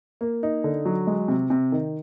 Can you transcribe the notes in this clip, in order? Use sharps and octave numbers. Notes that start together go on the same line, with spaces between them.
A#3
D#4
D3
F#3
G#3
C3
C3
D#3